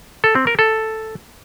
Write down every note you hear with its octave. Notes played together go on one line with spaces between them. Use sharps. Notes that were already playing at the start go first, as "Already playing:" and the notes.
A4
C4
A#4
A4